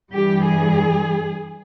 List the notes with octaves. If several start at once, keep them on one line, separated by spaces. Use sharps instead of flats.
G2 E3 G3 G4
G#4